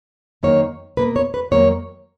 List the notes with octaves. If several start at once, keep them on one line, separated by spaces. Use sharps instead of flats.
F#2 D#3 A#3 C#5
B2 A#3 B4
C#5
B4
F2 D#3 F#3 A#3 C#5